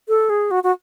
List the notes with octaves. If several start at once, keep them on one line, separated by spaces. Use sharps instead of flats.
A4
G#4
F#4
F#4